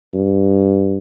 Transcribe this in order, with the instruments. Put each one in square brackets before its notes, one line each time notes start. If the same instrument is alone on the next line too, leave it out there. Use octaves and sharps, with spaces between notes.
[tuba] G2